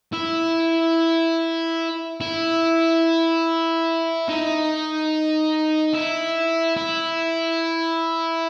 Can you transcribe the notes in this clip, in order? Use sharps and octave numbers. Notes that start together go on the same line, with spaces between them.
E4
E4
D#4
E4
E4